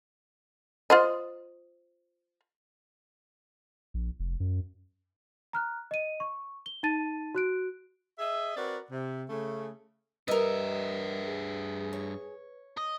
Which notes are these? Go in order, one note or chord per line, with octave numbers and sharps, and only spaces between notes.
F4 C5 D#5
A#1
F1
F#2
A#5 F6 F#6
D#5 D#7
C#6
G7
D#4 A5 A6 D#7
F#4 F#6 D7
G#4 D#5 E5
C4 F#4 A#4 B4 D5
C3
C#3 A3
G2 G3 A#4 B4 D#5 E5
G#4
C#5
D#5